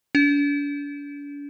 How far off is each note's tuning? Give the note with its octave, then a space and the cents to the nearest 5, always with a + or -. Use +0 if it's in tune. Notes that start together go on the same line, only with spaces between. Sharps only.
D4 -40